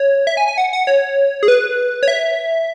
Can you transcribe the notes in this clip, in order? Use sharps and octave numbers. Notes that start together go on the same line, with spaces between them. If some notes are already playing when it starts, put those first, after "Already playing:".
Already playing: C#5
E5
G#5
G#5
F#5
F#5
C#5
G#4
B4
C#5
E5